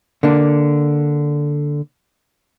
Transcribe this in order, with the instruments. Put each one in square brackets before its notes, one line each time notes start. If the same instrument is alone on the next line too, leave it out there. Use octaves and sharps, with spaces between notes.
[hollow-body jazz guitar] D3 A#3 D4